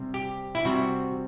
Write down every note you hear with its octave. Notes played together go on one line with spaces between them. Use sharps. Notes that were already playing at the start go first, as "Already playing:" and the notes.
Already playing: C3 G3 C4
G4
E4
C3 G3 C4 F#4